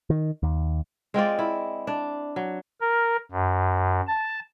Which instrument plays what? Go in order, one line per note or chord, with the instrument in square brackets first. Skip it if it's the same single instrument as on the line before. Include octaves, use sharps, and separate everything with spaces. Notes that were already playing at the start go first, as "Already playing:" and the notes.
[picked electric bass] D#3
D#2
[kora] G#3 C4 F4 D5
E4
D4
F#3
[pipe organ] A#4
F#2
A5